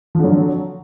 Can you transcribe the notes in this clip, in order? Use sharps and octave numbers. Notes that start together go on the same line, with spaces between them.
D3 F3 F#3